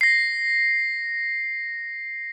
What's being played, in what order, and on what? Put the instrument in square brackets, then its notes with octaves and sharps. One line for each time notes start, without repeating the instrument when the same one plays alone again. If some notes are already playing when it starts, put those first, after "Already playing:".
[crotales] A#6 C7